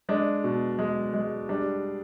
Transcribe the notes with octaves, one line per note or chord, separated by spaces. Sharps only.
G#3 D4
B2
G#3
G#3
G3 D4